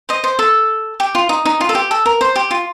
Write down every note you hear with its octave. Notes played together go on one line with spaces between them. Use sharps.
C5 D#5
C5
A4
G4
F4
D#4
D#4
F4
A4
G4
A4
A#4
C5
G4
F4